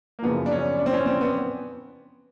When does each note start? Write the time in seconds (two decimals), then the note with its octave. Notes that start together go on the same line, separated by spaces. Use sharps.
0.19 A#3
0.22 F#2 C#3 F3 B3
0.46 D4
0.51 C#4
0.79 D4
0.86 C4
0.93 C#4
1.06 C4
1.21 B3